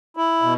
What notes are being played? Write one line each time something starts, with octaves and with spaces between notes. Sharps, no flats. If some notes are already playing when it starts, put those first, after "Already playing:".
E4
B2